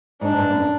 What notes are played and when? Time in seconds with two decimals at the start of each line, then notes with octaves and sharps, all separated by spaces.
0.21 G#2 D4
0.37 G2
0.51 F#2